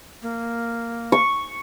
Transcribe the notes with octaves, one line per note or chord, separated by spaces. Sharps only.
A#3
C#6